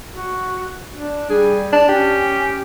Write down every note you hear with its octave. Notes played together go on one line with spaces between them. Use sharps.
F#4
D4
G3 G#4
D4
C#4 G4